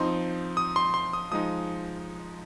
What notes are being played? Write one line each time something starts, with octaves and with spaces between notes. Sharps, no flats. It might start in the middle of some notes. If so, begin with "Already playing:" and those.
Already playing: F3 C4 D#4 C6
D#6
C6
C6
D#6
F3 G#3 D#4 D#6